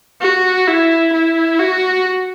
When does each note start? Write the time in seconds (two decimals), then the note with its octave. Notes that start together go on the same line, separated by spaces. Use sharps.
0.22 F#4
0.68 E4
1.13 E4
1.60 F#4